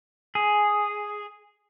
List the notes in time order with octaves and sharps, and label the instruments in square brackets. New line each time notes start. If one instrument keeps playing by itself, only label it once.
[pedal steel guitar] G#4